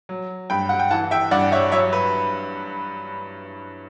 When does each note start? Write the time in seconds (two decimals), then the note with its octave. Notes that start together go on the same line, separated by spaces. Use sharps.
0.09 F#3
0.50 G2 G5 B5
0.69 F#5
0.80 G5
0.91 E3 F#5 A5
1.11 E5 G5
1.31 G2 D5 F#5
1.52 C#5 E5
1.72 F#3 C#5 E5
1.93 B4